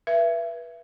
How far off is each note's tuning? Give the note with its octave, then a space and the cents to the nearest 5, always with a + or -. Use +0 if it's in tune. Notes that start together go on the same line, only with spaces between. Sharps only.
B4 -25 E5 +25